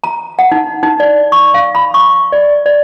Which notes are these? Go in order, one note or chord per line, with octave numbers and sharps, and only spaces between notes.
A#5
F#5
D#4
D#4
D5
C#6
F5
B5
C#6
D5
D5